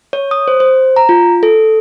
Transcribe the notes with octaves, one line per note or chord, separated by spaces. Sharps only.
C#5
D#6
C5
C5
A#5
F4
A4